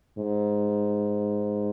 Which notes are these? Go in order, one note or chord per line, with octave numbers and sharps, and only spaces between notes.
G#2